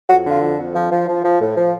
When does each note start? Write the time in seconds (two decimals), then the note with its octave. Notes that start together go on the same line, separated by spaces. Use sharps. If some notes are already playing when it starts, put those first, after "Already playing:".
0.09 F2 F#4
0.25 D3
0.31 F4
0.41 F2
0.58 F2
0.75 F3
0.91 F3
1.08 F3
1.24 F3
1.41 A2
1.57 F3